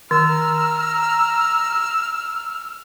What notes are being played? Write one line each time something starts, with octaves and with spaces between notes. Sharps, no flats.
D#3 A#5 E6 F6